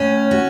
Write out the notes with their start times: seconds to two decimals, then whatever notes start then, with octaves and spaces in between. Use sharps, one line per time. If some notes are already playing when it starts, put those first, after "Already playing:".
Already playing: A2 C#4
0.31 F#4